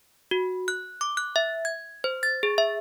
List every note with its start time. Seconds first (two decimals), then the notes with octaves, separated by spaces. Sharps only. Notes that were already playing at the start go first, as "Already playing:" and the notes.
0.31 F#4
0.68 F#6
1.01 D6
1.17 F#6
1.36 E5
1.65 G#6
2.04 C5
2.23 A6
2.43 G#4
2.58 E5